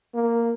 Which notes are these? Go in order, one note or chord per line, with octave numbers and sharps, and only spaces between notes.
A#3